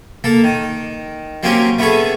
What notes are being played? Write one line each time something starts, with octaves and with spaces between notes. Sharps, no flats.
A#3 A4
D#3
F#3 A#3 C4 C#4 G4
A3 B3 C#4 G#4 A4